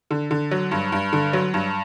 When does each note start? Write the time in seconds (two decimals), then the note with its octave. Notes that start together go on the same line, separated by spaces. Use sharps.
0.11 D3
0.31 D3
0.51 F#3
0.71 G2
0.92 G2
1.13 D3
1.33 F#3
1.54 G2